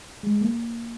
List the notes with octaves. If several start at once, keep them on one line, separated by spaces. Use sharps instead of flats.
G#3
A#3